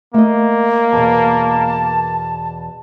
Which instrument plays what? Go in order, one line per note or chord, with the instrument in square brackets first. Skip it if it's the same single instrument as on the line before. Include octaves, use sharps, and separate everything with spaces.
[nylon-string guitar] A3 D#5 [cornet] A#3
[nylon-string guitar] E2 B2 [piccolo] A5